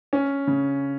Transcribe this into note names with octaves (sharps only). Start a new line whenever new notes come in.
C#4
C#3